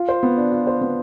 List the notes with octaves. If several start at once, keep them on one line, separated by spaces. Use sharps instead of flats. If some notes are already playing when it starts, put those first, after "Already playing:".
Already playing: F4
C5
B3
D4
F4
C5
B3